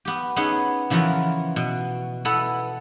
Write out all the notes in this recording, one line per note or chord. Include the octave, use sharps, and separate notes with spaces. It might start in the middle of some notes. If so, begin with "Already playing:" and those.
B3 G4
B3 C#4 D#4 G#4 B4 C#5
C#3 E3 F3 B3 F#4 A#4
B2
B3 E4 A4 B4